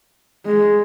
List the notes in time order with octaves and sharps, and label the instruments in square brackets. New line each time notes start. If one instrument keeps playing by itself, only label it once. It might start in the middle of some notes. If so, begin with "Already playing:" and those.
[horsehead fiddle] G#3